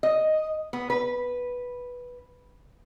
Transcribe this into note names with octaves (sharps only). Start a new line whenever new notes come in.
D#5
B3
B4